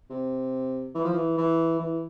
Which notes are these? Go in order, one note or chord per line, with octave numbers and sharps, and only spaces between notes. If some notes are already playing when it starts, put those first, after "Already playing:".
C3
E3
F3
E3
E3
E3